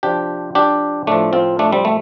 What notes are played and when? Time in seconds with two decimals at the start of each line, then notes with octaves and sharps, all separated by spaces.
0.03 C3 F3 D4 G4
0.55 D4 G4
1.07 A2 F3 A3 D4
1.33 C4 F4
1.59 A3 D4
1.73 G3 C4
1.85 A3